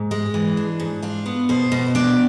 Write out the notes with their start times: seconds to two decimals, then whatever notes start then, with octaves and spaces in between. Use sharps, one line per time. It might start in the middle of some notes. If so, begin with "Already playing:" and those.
Already playing: G#2
0.11 G#3
0.34 E3
0.57 D4
0.80 G#2
1.02 D4 F4
1.26 B3
1.49 B2 C5
1.72 B2
1.95 D4 D5